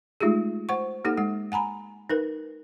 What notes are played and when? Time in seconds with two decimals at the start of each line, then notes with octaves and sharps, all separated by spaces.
0.21 G#3 A3 D#4 F4 G4 G#4
0.69 C5 F#5 C#6
1.05 A#3 D#4 G4 A4 F#5
1.17 G#3 F#5
1.52 F#5 G#5 A#5 B5
2.10 D#4 A#4 B4